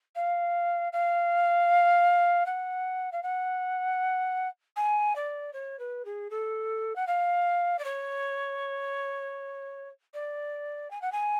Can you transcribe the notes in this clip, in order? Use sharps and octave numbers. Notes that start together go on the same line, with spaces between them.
F5
F5
F#5
F5
F#5
G#5
D5
C#5
B4
G#4
A4
F#5
F5
D5
C#5
D5
G#5
F#5
G#5